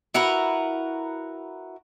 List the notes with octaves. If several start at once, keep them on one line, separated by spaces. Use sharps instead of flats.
E4 F#4 A#4 B4